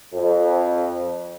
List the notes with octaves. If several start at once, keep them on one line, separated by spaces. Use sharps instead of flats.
F2